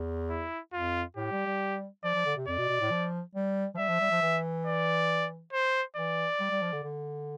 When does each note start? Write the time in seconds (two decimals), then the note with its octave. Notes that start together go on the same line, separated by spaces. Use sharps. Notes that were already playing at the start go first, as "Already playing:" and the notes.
Already playing: E2
0.30 E4
0.73 F2 F4
1.17 A2 G4
1.32 G3
1.46 G3
2.04 F3 D5
2.15 F3
2.26 D3
2.37 C3
2.48 F2 D5
2.58 B2
2.69 B2
2.81 A2
2.91 F3
3.35 G3
3.75 F3
3.78 G3 E5
3.89 F3
4.01 G3
4.11 F3
4.22 E3
4.66 D5
5.53 C5
5.96 E3 D5
6.40 G3
6.51 G3
6.62 F3
6.73 D3
6.83 D3